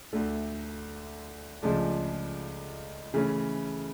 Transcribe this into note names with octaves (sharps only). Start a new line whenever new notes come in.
D2 D3 A3
C#2 C#3 F3 A3 D4
C#3 E3 A3 C#4